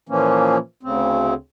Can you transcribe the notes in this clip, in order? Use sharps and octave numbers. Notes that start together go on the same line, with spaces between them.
A#2 E3 F3 A#3 C#4
D2 C#3 C4